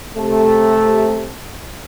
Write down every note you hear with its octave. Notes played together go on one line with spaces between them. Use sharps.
C3 A3